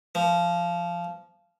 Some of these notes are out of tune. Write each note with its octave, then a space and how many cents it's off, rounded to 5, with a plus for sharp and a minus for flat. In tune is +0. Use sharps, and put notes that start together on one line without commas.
F3 -15